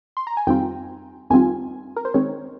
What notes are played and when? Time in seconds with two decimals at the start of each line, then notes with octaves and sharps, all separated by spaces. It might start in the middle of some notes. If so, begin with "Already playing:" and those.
0.17 C6
0.27 A#5
0.37 G#5
0.47 F2 D#3 G3 C4 F4 G5
1.30 F2 D#3 G3 C4 F4 G#5
1.96 A#4
2.05 C5
2.14 D#3 G#3 C4 C#5